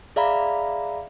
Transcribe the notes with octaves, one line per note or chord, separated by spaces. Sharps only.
G#4 D5 E5 F5 A#5 B5